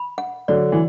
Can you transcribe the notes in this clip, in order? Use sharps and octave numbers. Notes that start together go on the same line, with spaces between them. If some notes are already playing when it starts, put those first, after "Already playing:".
Already playing: B5
F#5
D3 F#3 D5
E3